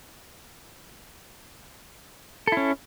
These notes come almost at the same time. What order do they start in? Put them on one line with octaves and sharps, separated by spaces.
A4 E4 C#4